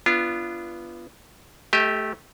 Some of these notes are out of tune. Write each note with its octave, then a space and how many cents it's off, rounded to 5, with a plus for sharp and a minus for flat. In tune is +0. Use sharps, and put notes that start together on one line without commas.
B3 +0 D4 +0 F4 -30
A3 -15 G4 +0 D#5 +40